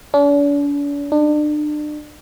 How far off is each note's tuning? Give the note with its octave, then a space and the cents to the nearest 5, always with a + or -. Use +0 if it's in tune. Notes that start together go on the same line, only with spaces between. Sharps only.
D4 -45
D4 +35